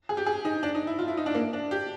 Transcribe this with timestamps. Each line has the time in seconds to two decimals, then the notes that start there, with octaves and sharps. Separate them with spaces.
0.09 G#4
0.17 G4
0.26 G#4
0.45 D#4
0.63 D4
0.75 D#4
0.87 E4
0.99 F4
1.08 E4
1.17 D#4
1.26 D4
1.35 A#3
1.53 D4
1.71 G4